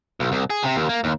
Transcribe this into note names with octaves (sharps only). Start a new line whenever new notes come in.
B1
C2
G#4
C3
D#2
A#3
D#2